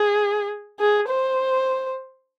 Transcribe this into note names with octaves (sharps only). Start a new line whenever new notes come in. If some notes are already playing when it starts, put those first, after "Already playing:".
Already playing: G#4
G#4
C5